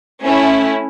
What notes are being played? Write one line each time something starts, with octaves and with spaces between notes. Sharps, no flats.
A3 C#4 E4